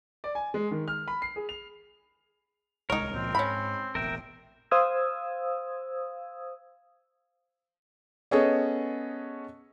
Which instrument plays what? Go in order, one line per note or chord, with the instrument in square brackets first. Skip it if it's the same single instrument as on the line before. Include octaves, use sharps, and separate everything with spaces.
[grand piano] D5
G#5
G#3
D#3
F6
B5
C7
G#4
F7
[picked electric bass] D1 C2 G#3 [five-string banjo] D#4 C#5 [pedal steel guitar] A#4
[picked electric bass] C#2 A#2 F3 [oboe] C4
[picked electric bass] G#2 [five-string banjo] C#4 B5
[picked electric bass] E1 A1 E2 [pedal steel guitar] A#4 E5 G5
[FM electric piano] C5 F5 D#6 E6 G#6
[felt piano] B3 C#4 G#4 A4 C#5 D#5